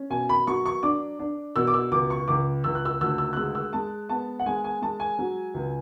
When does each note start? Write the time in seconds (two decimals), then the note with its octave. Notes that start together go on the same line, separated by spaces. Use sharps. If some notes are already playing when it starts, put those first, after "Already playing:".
Already playing: C#4
0.10 B2 G#5
0.29 B5
0.47 F#3 C#6
0.66 C#6
0.83 D4 D6
1.19 D4
1.56 B2 E6
1.67 D6
1.74 E6
1.91 C#2 D6
2.10 C#6
2.28 C#2 D6
2.64 C#2 E6
2.75 F#6
2.85 E6
3.01 D2 E6
3.18 E6
3.33 F#6
3.37 G#3 E6
3.55 E6
3.73 G#3 A5
4.09 B3 A5
4.39 F#5
4.46 G#3 G#5
4.64 G#5
4.82 G#3 A5
5.00 G#5
5.19 F#3
5.54 C#2